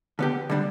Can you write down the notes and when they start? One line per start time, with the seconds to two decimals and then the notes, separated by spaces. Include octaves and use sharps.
0.19 D3 B3 G4
0.50 D3 G3 D4